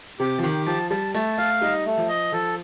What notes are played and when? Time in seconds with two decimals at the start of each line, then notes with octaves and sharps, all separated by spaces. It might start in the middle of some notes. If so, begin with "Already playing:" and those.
0.20 C3 G4
0.39 F3
0.43 D#3 G4
0.66 F3 A5
0.91 G3 A5
1.14 A3 A5
1.38 A3 F5
1.61 G3 D#4
1.85 A3
1.97 F3
2.09 D#5
2.32 F3 A4